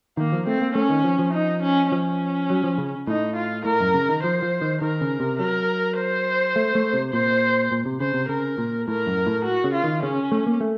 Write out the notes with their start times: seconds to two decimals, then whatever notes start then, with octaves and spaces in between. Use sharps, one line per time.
0.17 D#3 A#3
0.32 F3
0.47 A3 C4
0.61 A#3
0.75 A3 C#4
0.90 D#3
1.04 F3
1.19 F3
1.33 D#4
1.62 C#4
1.91 F3 C#4
2.50 F#3
2.64 F3
2.78 C#3
3.07 A2 D#4
3.36 F4
3.65 A2 A#4
3.80 F#2
3.94 C#3
4.09 D#3
4.23 F3 C5
4.42 F3
4.61 D#3
4.82 D#3 A#4
5.01 C#3
5.20 C3
5.39 F#3 A#4
5.98 C5
6.56 A3
6.75 A3
6.93 C3
7.13 A#2 C5
7.72 A#2
7.86 C3
8.00 C#3 C5
8.14 C3
8.29 C#3 A#4
8.58 A#2
8.88 A2 A#4
9.06 F#2
9.26 A2
9.45 F#4
9.64 C#3
9.74 F4
9.84 D#3
10.03 C#3 C#4
10.32 A3
10.47 A#3
10.60 A3